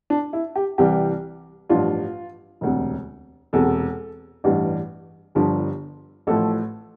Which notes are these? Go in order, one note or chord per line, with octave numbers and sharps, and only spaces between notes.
D4
E4
G4
C2 C3 E3 G3 G4
A1 G2 F3 F4
E1 D2 C3
E1 E2 C3 A4
A1 G2 E3 G3
G1 G2 D3 F3
A1 A2 F3 A4